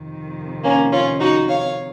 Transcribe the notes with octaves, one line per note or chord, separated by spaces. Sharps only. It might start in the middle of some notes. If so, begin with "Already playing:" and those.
Already playing: F2 C3 D#3
A#3 C#4
C#4 F4
D#4 F#4
C#5 F5